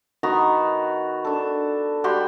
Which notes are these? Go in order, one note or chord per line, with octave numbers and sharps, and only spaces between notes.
D#3 B3 F#4 A#5
D4 A4
G3 F#4 G5 C6